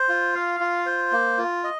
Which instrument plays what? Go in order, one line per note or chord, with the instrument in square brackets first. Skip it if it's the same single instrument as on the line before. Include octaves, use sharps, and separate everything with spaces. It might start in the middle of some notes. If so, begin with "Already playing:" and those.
Already playing: [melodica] C5
F4
F5
F4
C5
A#3
F4
D#5